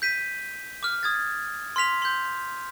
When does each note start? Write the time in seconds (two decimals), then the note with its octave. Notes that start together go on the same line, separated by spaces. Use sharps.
0.02 G6 B6 D#7
0.83 D6 F6
1.03 D#6 G#6 A6
1.76 C6 F6 B6 F7
2.02 C6 G6